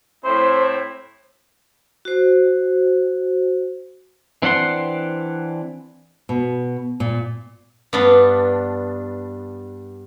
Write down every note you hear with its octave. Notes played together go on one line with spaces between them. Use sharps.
A2 C4 E4 C5
F#4 C5
E3 C4 D4 F#5 C6
B2
A#2
G2 B3 D4